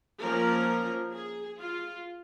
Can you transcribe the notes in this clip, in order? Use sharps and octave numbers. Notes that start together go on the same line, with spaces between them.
F3 A#3 C#4 A#4
G#4
F4